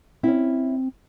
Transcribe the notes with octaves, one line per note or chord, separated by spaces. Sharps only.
C4 C#4 E4